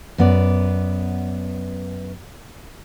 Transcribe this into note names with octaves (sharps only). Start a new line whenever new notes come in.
F#2 B3 D5